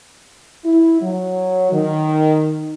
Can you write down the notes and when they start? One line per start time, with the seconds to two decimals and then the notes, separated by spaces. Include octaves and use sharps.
0.65 E4
1.02 F#3
1.72 D#3